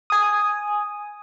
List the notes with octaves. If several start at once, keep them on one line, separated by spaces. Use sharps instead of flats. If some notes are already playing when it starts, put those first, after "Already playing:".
G#5 D#6